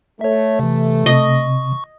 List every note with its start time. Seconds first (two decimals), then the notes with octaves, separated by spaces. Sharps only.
0.21 A3 C#5 E5
0.59 C3 E3
1.06 C3 D#5 C#6